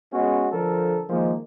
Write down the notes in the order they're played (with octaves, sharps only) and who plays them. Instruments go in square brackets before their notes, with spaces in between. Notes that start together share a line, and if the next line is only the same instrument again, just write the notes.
[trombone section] G#3 B3 C#4 F#4
D3 F3 A4 A#4
D#3 F3 G#3 A#3